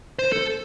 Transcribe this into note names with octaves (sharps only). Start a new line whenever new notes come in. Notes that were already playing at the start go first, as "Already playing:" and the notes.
C5
A4